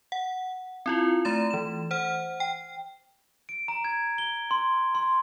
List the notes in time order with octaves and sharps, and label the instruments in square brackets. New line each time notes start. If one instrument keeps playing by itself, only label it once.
[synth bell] F#5
C4 E4 F4
A3 A#5 A6 E7
E3 E7
C5 F#5 F6
G5
[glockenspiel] D7
A#5
G#6
G7
C6
C6